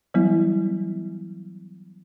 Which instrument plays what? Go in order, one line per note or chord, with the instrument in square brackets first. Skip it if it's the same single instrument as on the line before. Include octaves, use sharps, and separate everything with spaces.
[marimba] E3 F#3 G3 B3 E4